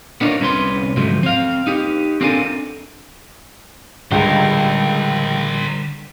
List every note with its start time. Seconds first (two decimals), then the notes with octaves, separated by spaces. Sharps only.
0.21 B3 D4 D#4 F4 A#4 C#5
0.40 C2 C3 C#4 B4 C6
0.96 D2 G#2 F3 F#3 A3
1.23 C4 F5
1.67 D#4 G4
2.21 C4 D4 F4 A4 A#4 G#5
4.12 C#2 D3 G3 A#4 C5